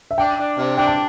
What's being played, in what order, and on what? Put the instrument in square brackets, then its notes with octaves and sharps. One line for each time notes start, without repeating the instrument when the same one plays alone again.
[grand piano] E5
[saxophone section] D4 [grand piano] G5
[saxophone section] D4
C3
[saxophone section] D4 [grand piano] G5
[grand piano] A5